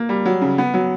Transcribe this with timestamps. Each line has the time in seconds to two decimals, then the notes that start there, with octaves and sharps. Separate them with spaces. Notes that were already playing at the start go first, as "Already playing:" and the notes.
Already playing: A#3
0.09 G3
0.26 F#3
0.41 C#3
0.58 B3
0.74 F#3